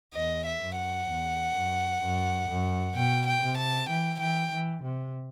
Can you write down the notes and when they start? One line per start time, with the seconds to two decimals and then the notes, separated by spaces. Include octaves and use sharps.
0.14 E2 D#5
0.46 E5
0.61 F#2
0.77 F#5
1.09 E2
1.55 F#2
2.01 F#2
2.48 F#2
2.95 B2 G5
3.27 G5
3.43 C3
3.57 A5
3.89 E3 G5
4.20 E3 G5
4.52 E3
4.83 C3